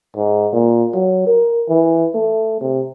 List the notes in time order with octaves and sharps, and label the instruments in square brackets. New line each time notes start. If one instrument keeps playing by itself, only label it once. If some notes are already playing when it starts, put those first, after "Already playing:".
[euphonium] G#2
A#2
F#3
A#4
E3
A3
C3